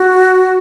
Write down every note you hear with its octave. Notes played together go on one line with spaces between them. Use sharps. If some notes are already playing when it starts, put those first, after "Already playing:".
Already playing: F#4